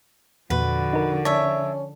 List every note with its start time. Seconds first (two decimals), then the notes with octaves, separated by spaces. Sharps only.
0.50 E2 A#2 D3 F3 F#4 B4
0.93 D#4 A#4
1.25 C#4 C#5 D5 E5 A5